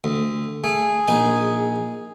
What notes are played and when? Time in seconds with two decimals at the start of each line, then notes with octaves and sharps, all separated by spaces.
0.04 D2
0.64 A3 G#4
1.08 A#1 D#4 G#5